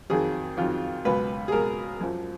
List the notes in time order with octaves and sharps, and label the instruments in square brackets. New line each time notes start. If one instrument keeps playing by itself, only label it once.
[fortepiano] F2 D#3 F#3 G#4
F2 D#3 F#3 F4
C#2 B2 F#3 B4
G#4
C#2 B2 F#3 A#4
F#2 F3